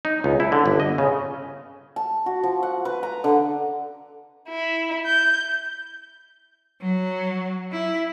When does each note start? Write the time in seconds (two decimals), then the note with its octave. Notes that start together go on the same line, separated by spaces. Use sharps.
0.05 D#4
0.24 C#2
0.40 E4
0.52 D3
0.66 G1
0.80 D#5
0.98 C#3
1.96 A5
2.26 F#4
2.43 F3
2.63 F#5
2.85 B4
3.03 A#5
3.24 D3
4.48 E4
5.05 G6
6.82 F#3
7.72 E4